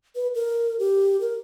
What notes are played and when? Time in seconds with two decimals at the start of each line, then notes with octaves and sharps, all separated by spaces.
0.15 B4
0.35 A#4
0.79 G4
1.21 A#4